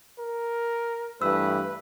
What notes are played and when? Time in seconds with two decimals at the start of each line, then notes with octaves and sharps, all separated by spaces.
0.19 A#4
1.22 G2 E3 A3 B4 E6